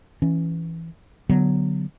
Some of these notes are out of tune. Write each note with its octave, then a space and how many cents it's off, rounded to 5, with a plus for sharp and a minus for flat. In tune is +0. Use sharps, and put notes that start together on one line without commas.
E3 +0 C#4 -5
D3 +0 F#3 +0 B3 +0